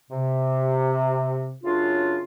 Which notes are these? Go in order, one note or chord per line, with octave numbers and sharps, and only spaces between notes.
C3
F#2 C#3 D4 F4